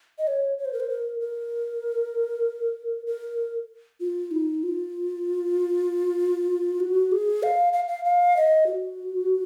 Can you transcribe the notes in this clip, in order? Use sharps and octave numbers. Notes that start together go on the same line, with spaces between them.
D#5
C#5
C#5
C5
A#4
C5
A#4
A#4
A#4
F4
D#4
F4
F#4
G#4
F5
F5
F5
F5
D#5
F#4